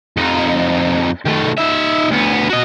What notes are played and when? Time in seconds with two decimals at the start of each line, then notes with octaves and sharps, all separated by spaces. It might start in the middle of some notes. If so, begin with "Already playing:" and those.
0.17 F2 D#4
1.26 D#3 A3
1.58 D#4 E5
2.11 D2 B3
2.50 F#4 D#5